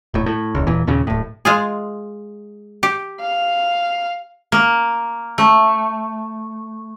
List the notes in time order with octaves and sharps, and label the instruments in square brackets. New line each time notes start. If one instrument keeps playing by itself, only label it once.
[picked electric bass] D#1 A2
A2
D#1 C#2
D#1 A#2 E3
D#2 A#2 C#3
D1 A2
[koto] G#3 F4 G#4
G4
[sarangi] F5
[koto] A#3
A3